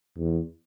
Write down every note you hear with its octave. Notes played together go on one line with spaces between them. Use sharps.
E2